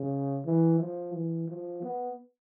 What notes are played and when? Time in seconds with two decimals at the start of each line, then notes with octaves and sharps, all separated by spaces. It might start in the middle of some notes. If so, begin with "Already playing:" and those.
Already playing: C#3
0.46 E3
0.80 F3
1.13 E3
1.48 F3
1.82 B3